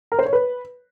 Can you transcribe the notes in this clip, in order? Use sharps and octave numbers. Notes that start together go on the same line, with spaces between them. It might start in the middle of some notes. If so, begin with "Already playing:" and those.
A#4
C5
C#5
B4